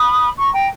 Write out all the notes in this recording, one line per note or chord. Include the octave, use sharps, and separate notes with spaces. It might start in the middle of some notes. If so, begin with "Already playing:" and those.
Already playing: B5 D#6
A#5 C#6
G5 A#5